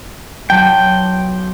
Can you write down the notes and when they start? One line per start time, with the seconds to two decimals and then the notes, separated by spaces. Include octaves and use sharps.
0.50 B1 F#3 G5 A5